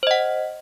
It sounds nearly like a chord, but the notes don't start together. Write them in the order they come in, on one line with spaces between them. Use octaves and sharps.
C5 D#5 F#5